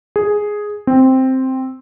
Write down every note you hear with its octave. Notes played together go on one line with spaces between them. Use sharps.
G#4
C4